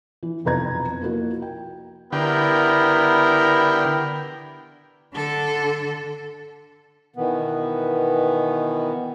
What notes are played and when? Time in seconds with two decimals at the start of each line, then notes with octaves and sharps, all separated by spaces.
0.23 E3
0.45 B1 F2 C3 B4 A#5 G#6
1.01 F3 A#3 E4 F#4 A#4
1.42 G5
2.12 D3 B3 E4 G4 A#4
5.14 D3 A4
7.16 B2 D#3 E3 B3